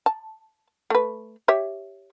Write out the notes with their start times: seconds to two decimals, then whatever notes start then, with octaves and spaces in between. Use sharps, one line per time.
0.06 A5
0.90 A3 B4
1.48 G4 C#5 E5